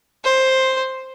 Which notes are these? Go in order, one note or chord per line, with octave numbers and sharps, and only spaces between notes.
C5